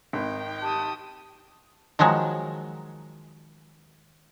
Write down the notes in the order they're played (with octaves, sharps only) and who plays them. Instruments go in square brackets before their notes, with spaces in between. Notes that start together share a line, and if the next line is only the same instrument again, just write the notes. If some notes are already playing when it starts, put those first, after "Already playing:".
[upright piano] G#1 [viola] D#4 G5
[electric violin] G4 D#6 [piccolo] A5
[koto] D#3 F3 F#3 G#3